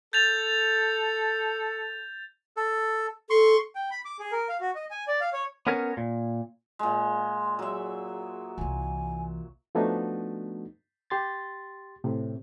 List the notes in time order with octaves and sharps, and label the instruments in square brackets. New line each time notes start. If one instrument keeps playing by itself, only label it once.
[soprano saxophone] A4 [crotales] G6 A6 F7
[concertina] A4
[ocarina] A4 [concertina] C6 C#6
[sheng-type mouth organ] G5
B5
D6
G#4
A#4
F5
F#4
D#5
G#5
D5
F5
C#5
[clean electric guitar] B3 C#4 A#4 C#5
A#2
[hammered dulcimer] A#2 G#3
[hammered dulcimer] F#3 E5 [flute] G#4
[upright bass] C2 E3 [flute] G#5
[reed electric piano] F3 A3 B3 D4 D#4 F#4
G4 C6 A6
A2 C3